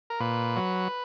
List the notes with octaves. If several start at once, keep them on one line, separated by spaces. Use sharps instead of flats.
A#4
A#2 B4
F#3